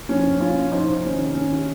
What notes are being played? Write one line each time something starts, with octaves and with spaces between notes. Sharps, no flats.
F3 C#4
A#2
F3 C#4 F4
A#2
F3 C4 D#4
A#2
D#3 C#4
C3
D#3 C#4
C3